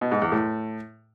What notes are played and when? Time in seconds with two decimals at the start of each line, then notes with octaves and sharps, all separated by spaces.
0.01 B2
0.12 G#2
0.22 E2
0.32 A2